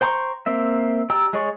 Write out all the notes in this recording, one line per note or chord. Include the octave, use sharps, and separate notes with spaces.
C5 G5 A#5 C6 C#6
A#3 C4 E5
G4 D5 G5 A#5 E6
G#3 G#4 C#5 D5 C#6